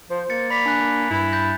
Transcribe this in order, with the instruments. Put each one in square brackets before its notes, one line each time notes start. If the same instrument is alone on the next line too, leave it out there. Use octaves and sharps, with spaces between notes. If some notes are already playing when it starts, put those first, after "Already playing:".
[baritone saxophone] F3 [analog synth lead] C5
[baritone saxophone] A#3 [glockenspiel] A6 C#7
[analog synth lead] D5 [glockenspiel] B5 B6 F7
[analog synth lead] D4 [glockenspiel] G#5 F#6
[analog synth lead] G2 [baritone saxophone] E4
[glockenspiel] G6 A6 A#6